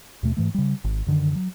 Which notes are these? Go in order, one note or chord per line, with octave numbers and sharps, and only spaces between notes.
D#2 B2 A3
G#2 E3 A3
C#3 G3
G#1
F#2 D3 D#3
F#3